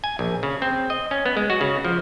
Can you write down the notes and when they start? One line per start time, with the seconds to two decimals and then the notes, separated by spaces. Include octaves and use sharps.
0.04 G#5
0.19 A#1
0.43 C#3
0.62 C4
0.90 D#5
1.11 C#4
1.26 B3
1.37 G#3
1.50 F#4
1.61 C#3
1.85 F3